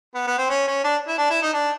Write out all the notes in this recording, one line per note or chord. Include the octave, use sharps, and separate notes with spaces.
B3
B3
C4
C#4
C#4
D4
E4
D4
E4
D#4
D4